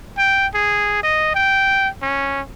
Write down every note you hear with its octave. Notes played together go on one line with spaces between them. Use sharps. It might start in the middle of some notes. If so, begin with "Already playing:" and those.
G5
G#4
D#5
G5
C#4